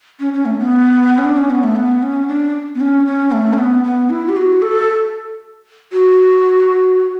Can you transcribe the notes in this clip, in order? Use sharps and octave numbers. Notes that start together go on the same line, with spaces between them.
C#4
C#4
A3
B3
C#4
D4
C#4
B3
A3
B3
C#4
D4
B3
C#4
C#4
A3
C#4
B3
B3
E4
G4
F#4
A4
F#4